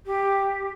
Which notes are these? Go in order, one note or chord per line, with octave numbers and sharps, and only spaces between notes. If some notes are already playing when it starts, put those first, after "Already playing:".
G4